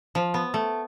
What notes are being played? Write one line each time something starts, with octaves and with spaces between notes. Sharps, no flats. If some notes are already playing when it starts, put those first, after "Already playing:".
F3
B3
A3